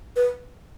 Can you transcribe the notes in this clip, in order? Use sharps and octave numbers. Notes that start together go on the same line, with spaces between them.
B4